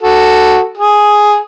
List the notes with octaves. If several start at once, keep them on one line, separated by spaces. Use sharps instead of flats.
F#4 A4
G#4